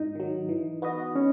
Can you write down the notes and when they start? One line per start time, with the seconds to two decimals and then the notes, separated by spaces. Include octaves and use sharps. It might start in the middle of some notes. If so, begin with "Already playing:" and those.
Already playing: G#2 D#4
0.15 D#3 F#3
0.49 E3
0.82 B3 F#4 B4 D#5
1.16 C#4